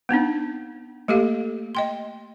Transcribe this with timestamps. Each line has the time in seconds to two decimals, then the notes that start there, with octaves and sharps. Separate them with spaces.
0.09 B3 C4 D4 D#4
1.08 A3 A#3 G4 A4 F5
1.75 D#5 G5 C6